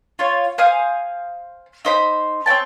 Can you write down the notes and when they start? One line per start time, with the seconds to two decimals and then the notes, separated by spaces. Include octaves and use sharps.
0.19 F4 C#5
0.58 C5 F5 G#5 D#6
1.85 D#4 C5 B5
2.46 C4 C#5 G5 A5